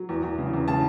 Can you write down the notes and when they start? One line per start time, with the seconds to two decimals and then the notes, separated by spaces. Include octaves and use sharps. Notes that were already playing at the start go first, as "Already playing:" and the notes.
Already playing: F#3
0.09 E2
0.23 E2
0.38 C#3
0.53 E2
0.68 C#3 A5